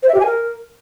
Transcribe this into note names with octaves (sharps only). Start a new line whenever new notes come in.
C5
E5
G4
G#5
A#4